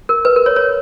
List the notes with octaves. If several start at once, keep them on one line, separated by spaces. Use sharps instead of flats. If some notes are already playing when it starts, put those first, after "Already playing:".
A#4
B4
A#4
C#5
C#5